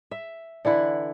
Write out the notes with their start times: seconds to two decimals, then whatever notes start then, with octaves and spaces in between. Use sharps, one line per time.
0.11 E5
0.65 D3 E3 E4 F#5